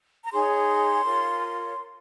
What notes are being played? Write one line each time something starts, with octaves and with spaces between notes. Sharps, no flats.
A#5
D#4 G#4 C#5 C6
F4 A#4 C#5